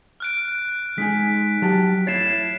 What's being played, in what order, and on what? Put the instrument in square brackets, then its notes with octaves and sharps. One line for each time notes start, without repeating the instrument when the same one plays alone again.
[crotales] F6 F#6 D7
[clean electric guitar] G#3 D#4 G#4 [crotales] B6
[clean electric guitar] F#3 G4 A5
[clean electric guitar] E4 C#5 [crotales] A6 C7 E7